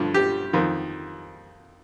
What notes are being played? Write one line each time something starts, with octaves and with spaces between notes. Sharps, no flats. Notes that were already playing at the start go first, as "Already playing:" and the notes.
Already playing: G2 D3 F3
G4
F2 D#3